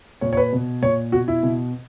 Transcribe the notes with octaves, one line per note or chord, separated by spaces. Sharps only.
A#2 C#5
C#5
B4
B2
A#2 C#5
B2 F#4
E4
B2